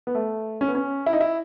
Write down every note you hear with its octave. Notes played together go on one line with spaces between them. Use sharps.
B3
A3
C#4
B3
C#4
E4
D#4
E4